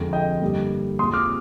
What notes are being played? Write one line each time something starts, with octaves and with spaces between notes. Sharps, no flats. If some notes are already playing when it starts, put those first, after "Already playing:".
Already playing: F2 D3 G#3
D#5 G5
G2 D3 G3 A#3
A#2 G#3 C4 C6 D#6
D6 F6